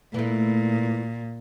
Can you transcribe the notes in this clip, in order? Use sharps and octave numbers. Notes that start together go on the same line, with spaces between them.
A#2 E3 A3